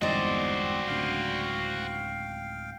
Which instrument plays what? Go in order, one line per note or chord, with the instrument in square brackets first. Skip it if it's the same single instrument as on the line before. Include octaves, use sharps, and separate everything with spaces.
[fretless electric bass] G1 E2 G#2 [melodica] C4 [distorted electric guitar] F#4 C5 [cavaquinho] D5 D#5
[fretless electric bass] D1 C#2 D4 [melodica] F5 G5